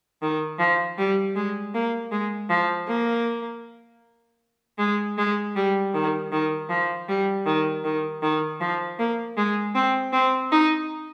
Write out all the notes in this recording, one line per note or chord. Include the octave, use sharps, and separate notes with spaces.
D#3
F3
G3
G#3
A#3
G#3
F3
A#3
G#3
G#3
G3
D#3
D#3
F3
G3
D#3
D#3
D#3
F3
A#3
G#3
C4
C4
D#4